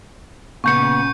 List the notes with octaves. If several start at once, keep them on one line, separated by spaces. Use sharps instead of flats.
A#2 C#3 B3 C#6 G6 C#7